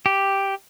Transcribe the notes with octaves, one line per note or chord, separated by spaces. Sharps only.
G4